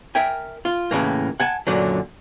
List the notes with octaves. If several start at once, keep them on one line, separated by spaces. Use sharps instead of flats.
A#4 E5 G5 G#5
F4
A2 C#3 E3 A#3
F#5 G#5 A5
F#2 A#2 D3 F#3